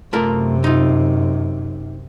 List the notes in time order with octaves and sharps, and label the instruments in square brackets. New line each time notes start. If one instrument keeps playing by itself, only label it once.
[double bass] F#2 C3 [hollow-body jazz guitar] A3 F4 A#4
[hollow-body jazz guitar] D#4 F4